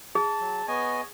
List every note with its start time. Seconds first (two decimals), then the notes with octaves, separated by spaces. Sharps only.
0.15 G#4 A5
0.40 F#3
0.68 B3 C#5 D#5 G#5